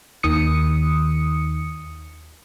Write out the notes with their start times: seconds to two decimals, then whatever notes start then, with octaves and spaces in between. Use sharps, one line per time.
0.23 D#2 D#3 D#6 C#7